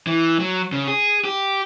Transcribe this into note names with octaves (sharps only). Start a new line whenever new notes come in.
E3
F#3
C#3
G#4
G4